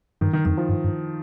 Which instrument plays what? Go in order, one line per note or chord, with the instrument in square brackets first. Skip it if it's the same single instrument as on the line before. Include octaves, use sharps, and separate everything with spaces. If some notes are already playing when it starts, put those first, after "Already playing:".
[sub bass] G2 [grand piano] D#3
[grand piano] D#3
[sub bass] F2 [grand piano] D#3
[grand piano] F3
[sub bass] G2
G2